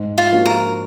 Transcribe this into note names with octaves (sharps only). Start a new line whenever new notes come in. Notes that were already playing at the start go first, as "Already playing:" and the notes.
Already playing: G#2
F4
F3 A#3 D4 F#4
A#4